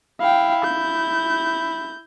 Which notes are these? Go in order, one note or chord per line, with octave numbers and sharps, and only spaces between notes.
E4 F5 G5
G6